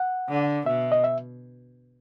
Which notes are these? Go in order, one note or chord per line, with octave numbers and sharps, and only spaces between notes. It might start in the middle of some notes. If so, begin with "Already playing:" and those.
Already playing: F#5
D3
B2 E5
D#5
E5